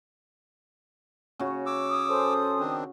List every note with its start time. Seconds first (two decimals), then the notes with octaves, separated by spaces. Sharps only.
1.39 C#3 F#4
1.66 C#5 D6 E6
1.89 D#6
2.09 C#4 A4 C5
2.60 D#3 C4 D4